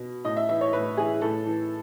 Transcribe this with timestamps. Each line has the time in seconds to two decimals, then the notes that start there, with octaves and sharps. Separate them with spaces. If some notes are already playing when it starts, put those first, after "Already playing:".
Already playing: B2
0.25 A2 D#5
0.37 E5
0.49 E3 E5
0.61 C#5
0.73 A2 B4
0.97 E3 G#4
1.21 A2 A4
1.46 E3